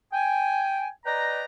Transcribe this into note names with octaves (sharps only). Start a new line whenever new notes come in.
G5 G#5
B4 D5 D#5 G5 A#5